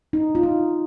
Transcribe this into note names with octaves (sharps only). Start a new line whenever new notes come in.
D#4
F4
D#4